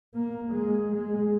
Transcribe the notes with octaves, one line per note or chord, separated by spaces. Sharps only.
A#3
G#3
G#3